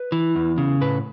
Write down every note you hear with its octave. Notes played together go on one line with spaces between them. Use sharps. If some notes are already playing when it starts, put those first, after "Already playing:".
Already playing: B4
E3
E2
C#3
A2 B4